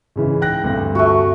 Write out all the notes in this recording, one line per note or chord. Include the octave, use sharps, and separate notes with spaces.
G#2 C#3 E3
G5 F#6 A#6
D2 G2 C3
A3 F#4